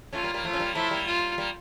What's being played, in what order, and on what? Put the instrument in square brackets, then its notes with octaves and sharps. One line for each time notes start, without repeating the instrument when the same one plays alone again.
[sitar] A3 C#4 [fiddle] F4
[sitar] G3 A#3
G3 A#3
[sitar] F3 A3 [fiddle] F4
[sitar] C#4
G3 A#3
[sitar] F3 A3 [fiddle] E4
[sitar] G3 A#3
[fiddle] F4
[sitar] G3 A#3